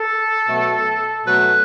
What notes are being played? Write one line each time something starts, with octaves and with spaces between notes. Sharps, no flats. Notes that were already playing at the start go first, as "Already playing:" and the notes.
Already playing: A4
B2 F#3 A3
B2 F#3 A3 B4